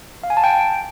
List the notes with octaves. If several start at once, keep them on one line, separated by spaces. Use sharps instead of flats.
F5
G#5
A5
G5